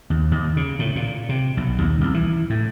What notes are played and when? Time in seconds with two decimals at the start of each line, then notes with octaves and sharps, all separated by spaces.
0.10 D#2
0.31 D#2
0.57 C#3
0.79 A2
0.96 A#2
1.29 C3
1.57 B1
1.81 D#2
2.01 C2
2.14 E3
2.50 A2